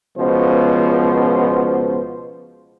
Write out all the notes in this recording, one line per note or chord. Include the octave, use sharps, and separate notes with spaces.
C#2 B2 F3 C5